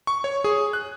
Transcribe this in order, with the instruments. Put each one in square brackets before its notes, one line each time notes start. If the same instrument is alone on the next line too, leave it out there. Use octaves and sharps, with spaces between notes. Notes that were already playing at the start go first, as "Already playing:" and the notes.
[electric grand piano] C#6
C#5
G#4
F#6